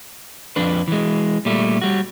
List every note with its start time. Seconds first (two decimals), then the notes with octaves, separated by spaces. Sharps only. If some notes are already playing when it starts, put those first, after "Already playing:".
0.56 F2 D4 B4
0.88 E3 G#3
1.45 A#2 G3 A3
1.81 G3 F#4